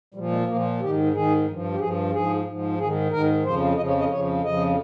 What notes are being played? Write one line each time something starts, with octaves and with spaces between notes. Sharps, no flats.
A#2 F3 G3
G#3
A#2 F3 A#3
G#2 D#3 G4
G#2 D#3 G#4
G2 F3
G4
G2 F3 G#4
G#2 F3 G#4
G#2 F3
G#2 D#3 G#4
G#2 D#3 A#4
F2 C#3 F3 C5
F2 C#3 F3 D#5
C#5
D#5
F2 C#3 F3 C#5
F2 C#3 F3 D#5